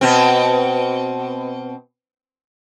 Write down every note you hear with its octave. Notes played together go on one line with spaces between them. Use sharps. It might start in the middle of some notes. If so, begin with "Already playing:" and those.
B2 C4